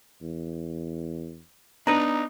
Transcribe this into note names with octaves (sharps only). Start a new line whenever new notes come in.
E2
B3 D4 D#4 B4 A#5